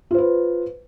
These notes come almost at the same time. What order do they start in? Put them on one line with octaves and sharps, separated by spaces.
F4 C5 B4